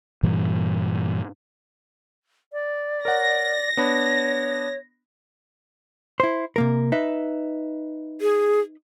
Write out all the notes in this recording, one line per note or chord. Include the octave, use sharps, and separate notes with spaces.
G2 A#2 E3 G3
D5
A#4 C#5 F#5 A#6
B3 D4 C#5 B5
E4 C5
C3 A#3 A#4
D#4 B4 E5
G#4